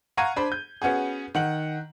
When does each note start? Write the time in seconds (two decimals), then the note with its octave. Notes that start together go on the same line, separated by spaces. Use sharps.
0.17 F5 F#5 A#5 C#6 G#6 D#7
0.36 D4 C5 B5
0.52 G6
0.82 B3 C#4 F#4 G#4
1.35 D#3 F#5 F#7